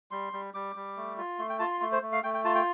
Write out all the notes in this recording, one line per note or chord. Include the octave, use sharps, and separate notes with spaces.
G3 C6
G3
G3 D6
G3
A3
F4
A3 C6
G5
F4 A5
C6
A3 C6
C5
A3
F5
A3 G5
G5
F4 A5
G5